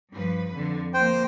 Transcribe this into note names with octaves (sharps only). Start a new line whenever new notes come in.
G2 F3 B4
F2 D3
F3 A#3 C5 G5